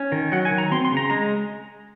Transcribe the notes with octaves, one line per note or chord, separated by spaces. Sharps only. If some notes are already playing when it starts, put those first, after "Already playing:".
Already playing: C#4
D#3
F#3 F#5
G#5
D#3
A#5
C4 C6
C6
C#3
A#5
G#3 A#5